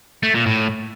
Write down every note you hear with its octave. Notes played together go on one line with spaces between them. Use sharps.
A3
A#2
A2